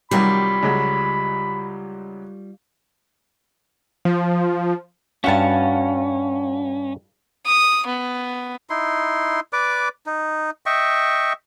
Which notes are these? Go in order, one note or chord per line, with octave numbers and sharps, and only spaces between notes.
C3 D#3 F#3 G3 F4 B5
C#2 F#3 G#3
F3
G2 C#4 F#4 E5 F5 A5
D#6
B3
D#4 E4 C6
B4 D5 D6
D#4
D#5 E5 G5 C#6